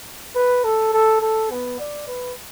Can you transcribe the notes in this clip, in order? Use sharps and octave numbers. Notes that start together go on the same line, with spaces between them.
B4
A4
A4
A4
B3
D5
B4